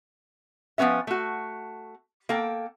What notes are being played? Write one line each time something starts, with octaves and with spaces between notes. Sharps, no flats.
F3 A3 B3 C#4 E5
A3 F#4
A#3 A4 G5